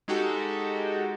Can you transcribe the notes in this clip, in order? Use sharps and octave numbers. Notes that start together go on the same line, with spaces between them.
G#3 D#4 F#4 G4 A4